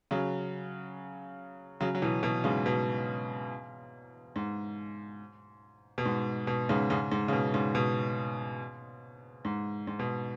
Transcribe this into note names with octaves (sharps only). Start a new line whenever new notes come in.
C#3 F#3
C#3 F#3
F#3
B2 E3
B2 E3
G#2 C#3
B2
G#2
B2
G#2
B2
G#2 C#3
G#2 C#3
G#2
C#3
B2
G#2 C#3
B2
G#2
G#2
B2